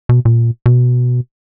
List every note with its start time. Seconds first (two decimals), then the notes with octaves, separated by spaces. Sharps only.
0.09 B2
0.25 A#2
0.66 B2